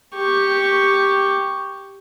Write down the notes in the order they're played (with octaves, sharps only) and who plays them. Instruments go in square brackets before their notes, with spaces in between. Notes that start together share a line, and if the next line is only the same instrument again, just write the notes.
[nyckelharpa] G4 C#6